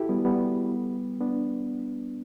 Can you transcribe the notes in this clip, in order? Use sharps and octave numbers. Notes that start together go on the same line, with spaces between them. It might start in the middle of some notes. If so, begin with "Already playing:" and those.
Already playing: E4 F#4 G4 A4
G3 B3
G3 B3
B3 D4